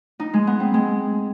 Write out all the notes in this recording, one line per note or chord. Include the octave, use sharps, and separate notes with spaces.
D#4
G#3
B3
C4
G#3